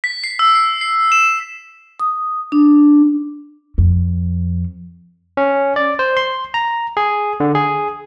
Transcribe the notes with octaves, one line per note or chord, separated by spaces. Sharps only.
B6
C7
E6
C7
C7
E7
D#6
D4
F2
C#4
D5
C5
C6
A#5
G#4
D3
G#4